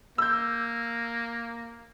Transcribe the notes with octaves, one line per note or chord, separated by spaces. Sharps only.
A#3 E6 G6